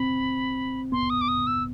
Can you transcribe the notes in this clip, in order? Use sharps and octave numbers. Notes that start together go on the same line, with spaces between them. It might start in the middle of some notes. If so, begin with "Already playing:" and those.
Already playing: C4 B5
B3 C6
D#6
D6
D#6
E6